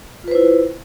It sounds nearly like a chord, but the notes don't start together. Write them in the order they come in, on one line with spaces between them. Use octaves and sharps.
F4 B4 C5 E4